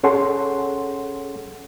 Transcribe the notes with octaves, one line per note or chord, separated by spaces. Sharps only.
C#4 G#4 A4 C#5 F#5 C6